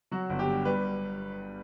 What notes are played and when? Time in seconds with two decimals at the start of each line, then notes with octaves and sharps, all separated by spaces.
0.11 F#3 F#4
0.30 G1
0.39 G4
0.47 G2
0.65 G3 B4